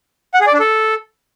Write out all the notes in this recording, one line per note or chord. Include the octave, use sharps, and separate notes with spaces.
F#5
G#4
D5
D4
A4